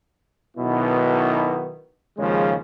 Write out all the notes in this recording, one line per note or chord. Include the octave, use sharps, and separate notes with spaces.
B1 B2 D#3 B3 E4
D#2 C#3 F3 G#3